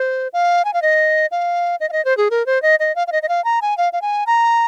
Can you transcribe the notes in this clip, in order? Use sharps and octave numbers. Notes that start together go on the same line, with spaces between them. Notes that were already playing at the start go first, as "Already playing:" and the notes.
Already playing: C5
F5
G#5
F5
D#5
F5
D#5
F5
D#5
C5
G#4
A#4
C5
D#5
D#5
F5
F5
D#5
D#5
F5
A#5
G#5
F5
F5
G#5
A#5